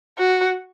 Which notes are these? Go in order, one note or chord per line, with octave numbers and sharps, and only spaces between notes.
F#4